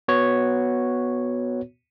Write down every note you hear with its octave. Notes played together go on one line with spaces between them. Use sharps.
B3 F#4 C#5